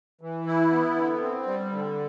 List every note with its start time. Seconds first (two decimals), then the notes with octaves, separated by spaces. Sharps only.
0.21 E3
0.46 E4
0.71 B3
0.96 D3
1.21 C4
1.46 G3
1.72 D3